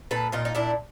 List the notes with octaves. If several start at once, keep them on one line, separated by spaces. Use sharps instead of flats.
A#2 A4 B4
A#2 D#4 F4
D#4
A#2 D4 E4